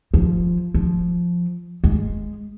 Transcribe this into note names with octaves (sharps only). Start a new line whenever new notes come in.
F3
F3
G#3